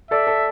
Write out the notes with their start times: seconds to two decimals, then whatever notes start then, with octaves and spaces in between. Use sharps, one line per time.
0.11 A4 D5 E5
0.27 A4